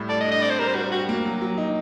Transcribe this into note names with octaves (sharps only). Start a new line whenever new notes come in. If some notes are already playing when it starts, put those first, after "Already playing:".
Already playing: A2 G3
A4 D5
D#5
D4
D#5
C4 D5
C5
G3 A#4
C5
G3 F#4
F#4 G4
A#3
F#3
F#3
D#4